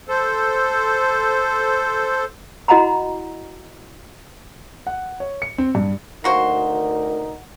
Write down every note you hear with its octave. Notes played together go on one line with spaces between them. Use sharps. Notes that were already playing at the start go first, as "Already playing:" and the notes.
A4 C5
E4 F#4 D#5 F#5 A#5 B5
F#5
C#5
C#7
C4
G2
D2 A#3 D#4 F#4 A#4 C5